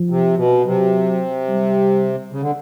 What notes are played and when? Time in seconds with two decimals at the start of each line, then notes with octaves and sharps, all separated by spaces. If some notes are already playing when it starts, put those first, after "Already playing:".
Already playing: F3
0.10 C3
0.37 B2
0.65 C3 F#3
1.49 G3
2.32 C#3
2.42 D3